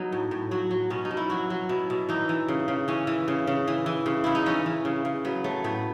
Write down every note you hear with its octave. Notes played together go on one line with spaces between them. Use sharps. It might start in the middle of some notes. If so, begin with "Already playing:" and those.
Already playing: F#3 B3 D#4
A2
A2
F#3 F#4
F#3
B2 C#4
D#4
B2
E4
F#3 F#4
F#3
B2 E4
B2
E3 D#4
E3
C#3
C#3
E3 C#4
E3
C#3
C#3
E3
E3
C#3
C#3 E4
D#4
E3 C#4
E3
C#3
C#3
F#3 B3
F#3 A3
A2 B3